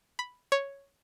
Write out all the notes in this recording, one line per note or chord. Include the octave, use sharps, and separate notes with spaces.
B5
C#5